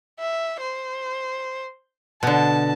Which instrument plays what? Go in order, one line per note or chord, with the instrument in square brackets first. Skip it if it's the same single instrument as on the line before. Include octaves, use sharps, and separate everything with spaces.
[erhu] E5
C5
[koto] B2 D3 [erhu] A5